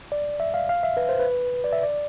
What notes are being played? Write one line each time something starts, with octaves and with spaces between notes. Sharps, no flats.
D5
E5
F5
F5
E5
B4
C5
B4
D5
E5
D5